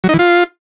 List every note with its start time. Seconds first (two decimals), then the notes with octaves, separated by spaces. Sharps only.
0.04 F#3
0.09 D#4
0.14 E3
0.19 F4